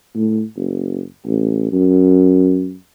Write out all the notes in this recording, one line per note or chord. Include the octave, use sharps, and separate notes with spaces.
A2
F#1
A1
F#2